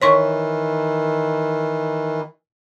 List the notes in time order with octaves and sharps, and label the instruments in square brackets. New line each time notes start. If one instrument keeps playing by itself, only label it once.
[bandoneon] D#3 E3 [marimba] C#5 C6 C#6